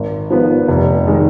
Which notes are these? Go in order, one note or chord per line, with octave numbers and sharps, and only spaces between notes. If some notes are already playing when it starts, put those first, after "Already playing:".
Already playing: G#1
G#2 F3 B3
F1
D#3 G#3